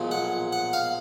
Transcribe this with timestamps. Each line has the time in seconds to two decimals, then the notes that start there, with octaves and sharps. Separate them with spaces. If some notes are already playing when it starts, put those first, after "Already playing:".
Already playing: B1 A#2 F3 G#3
0.11 F#5
0.53 F#5
0.73 F5